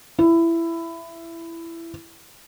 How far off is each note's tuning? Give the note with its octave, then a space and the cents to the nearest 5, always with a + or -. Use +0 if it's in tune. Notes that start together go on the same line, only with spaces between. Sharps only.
E4 +15